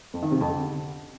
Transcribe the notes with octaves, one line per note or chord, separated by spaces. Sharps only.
F2
D#3
C3
F2
D3